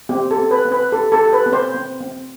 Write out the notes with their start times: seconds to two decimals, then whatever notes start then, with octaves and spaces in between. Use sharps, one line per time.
0.09 C4 G4
0.31 A4
0.37 C4
0.51 B4
0.65 C4
0.72 B4
0.92 G4 A4
1.12 A4
1.19 G4
1.33 B4
1.46 C4
1.53 C5
1.75 C4
2.01 C4